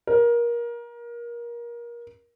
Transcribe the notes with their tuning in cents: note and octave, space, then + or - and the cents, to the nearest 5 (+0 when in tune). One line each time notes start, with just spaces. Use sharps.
A#4 +25